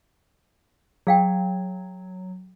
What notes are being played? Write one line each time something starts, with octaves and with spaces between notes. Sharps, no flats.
F#3 G#4 F5 G5